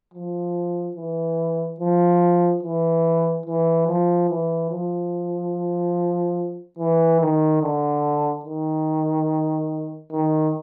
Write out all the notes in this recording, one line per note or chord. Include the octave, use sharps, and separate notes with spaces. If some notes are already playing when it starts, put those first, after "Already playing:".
F3
E3
F3
E3
E3
F3
E3
F3
E3
D#3
D3
D#3
D#3